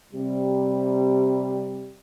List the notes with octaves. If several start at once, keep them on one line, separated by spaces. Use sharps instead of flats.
C3 G3